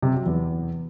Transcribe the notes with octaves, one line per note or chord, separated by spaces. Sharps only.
C3
F#3
E2